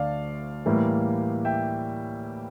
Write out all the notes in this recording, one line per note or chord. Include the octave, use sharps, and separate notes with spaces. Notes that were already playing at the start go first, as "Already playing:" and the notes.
Already playing: D2 D3 A3 D5 F5 A5
A2 E3 G3 A#3
E5 G5